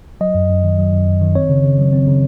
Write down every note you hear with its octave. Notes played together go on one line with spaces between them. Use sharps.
F#3 D#5
F#2
F#2
D#3
F#3
F#2
F#2
D#3
C4 C#5
C#3
C#3
F#3
C4
C#3